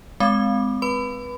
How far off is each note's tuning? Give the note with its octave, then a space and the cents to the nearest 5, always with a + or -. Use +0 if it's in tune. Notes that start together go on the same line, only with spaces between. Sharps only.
G#3 +0 C4 -30 D6 -5
B4 -20 B5 +25